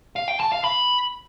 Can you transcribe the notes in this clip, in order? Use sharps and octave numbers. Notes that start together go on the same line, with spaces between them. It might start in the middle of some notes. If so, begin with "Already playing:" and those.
F5
G5
A5
F5
B5